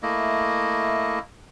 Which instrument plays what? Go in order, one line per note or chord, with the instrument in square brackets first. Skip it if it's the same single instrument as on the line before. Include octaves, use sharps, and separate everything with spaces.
[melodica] A3 A#3 E4 D#5